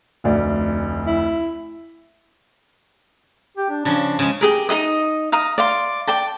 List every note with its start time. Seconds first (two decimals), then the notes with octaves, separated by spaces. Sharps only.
0.24 F1 D2 D5
1.06 E4
3.57 G4
3.70 D4
3.85 C#3 F3 D4
4.19 C#3 G#3
4.41 G4 G#4 A#4
4.69 D#4 A4 D#5 D#6
5.32 F5 A#5 D#6
5.58 D5 F5 C6
6.07 D5 G5 A5